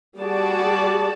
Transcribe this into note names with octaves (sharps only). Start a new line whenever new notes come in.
G3 F#4 G#4 D5 A5